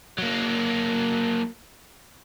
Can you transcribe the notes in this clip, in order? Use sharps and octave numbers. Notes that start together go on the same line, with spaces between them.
F#3 A#3